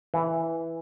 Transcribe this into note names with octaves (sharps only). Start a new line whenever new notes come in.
E3